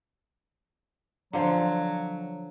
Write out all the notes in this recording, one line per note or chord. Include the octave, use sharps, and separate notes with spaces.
D3 F3 F#3